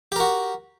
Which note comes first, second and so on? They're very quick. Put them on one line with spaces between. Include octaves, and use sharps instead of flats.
G4 A#4 F#4